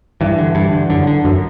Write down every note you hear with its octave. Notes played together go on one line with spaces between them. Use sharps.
G2 E3
D3
G2
D3
F#2 D3
D3
F#2